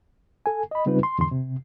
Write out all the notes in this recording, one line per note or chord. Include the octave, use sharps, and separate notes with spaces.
A4 G#5
D#5 B5
C#3 G3 C4 D#4 F4 B4
C6
E2 G#2 D3 C6
C3